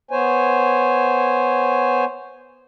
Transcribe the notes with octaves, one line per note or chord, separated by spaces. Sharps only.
B3 C5 C#5 G#5